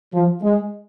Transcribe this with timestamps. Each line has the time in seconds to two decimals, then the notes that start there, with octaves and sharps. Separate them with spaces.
0.12 F3
0.42 G#3